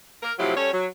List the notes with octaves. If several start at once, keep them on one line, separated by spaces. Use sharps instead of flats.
A#4
A2 C3 F3 F#3 E4 G4
G3 C#4 A4 C#5
F#3